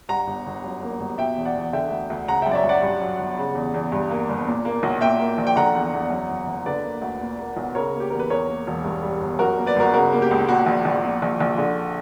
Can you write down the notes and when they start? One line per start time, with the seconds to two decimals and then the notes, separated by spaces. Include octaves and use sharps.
0.09 G2 F#5 A#5
0.27 G1
0.46 G1
0.64 F#2
0.82 A#3
1.00 G1
1.18 B2 E5 G5
1.36 E2
1.45 D5 F#5
1.55 E2
1.73 D3 E5 G5
1.91 D2
2.10 D2
2.27 C#3 F#5 A#5
2.42 E5 G5
2.46 F#2
2.51 D5
2.55 C#5 E5
2.64 F#2
2.69 D5 F#5
2.82 G2
3.01 F#3
3.19 G1
3.38 C#3
3.55 E2
3.74 E2
3.92 G2
4.10 A#3
4.29 G1
4.47 A#2
4.65 A#3
4.83 B1
5.01 A#2 E5 G5
5.19 A#3
5.38 A#1
5.47 G5
5.56 D3 F#5 A#5
5.75 E2
5.93 E2
6.10 F#2
6.29 F#1
6.47 F#1
6.66 D3 B4 D5
6.83 A#3
7.02 D2
7.21 A#2
7.39 A#3
7.57 B1
7.75 C#3 A#4 C#5
7.94 A#3
8.00 G4
8.10 E2 A#4
8.19 B4
8.29 E2 A#4 C#5
8.49 A#3
8.67 E1
8.85 G2
9.02 G3
9.21 G1
9.39 F#2 F#4 A#4
9.58 A#3
9.66 B4 D5
9.76 G1 F#4 A#4
9.94 C#3 F#4 A#4
10.13 A#3
10.22 G4
10.31 C#2
10.49 A#2 F#4
10.66 A#1
10.85 A#1
11.04 A#2
11.22 A#1
11.40 A#1
11.58 D3